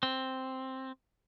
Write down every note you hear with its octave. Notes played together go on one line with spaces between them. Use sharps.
C4